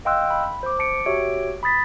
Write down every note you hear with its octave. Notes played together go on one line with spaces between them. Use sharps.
D#5 F5 G5 C6 E6 F#6
B5
C5 D6
A5 C#7 D7
F#4 G4 C#5 E5 D7
B5 D#6 A6 B6